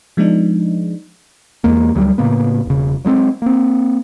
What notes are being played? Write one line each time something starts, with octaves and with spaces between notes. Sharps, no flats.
F3 G#3 B3 D4 D#4
E2 G#3 A#3
D2 F#3 G3
A2 C#3 A#3 B3
E1 C#3
F#3 G#3 B3 C4
A#3 C4